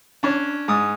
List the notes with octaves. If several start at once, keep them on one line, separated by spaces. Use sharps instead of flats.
C#4 D4
G#2 D#6